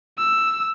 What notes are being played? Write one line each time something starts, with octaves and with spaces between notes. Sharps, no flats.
E6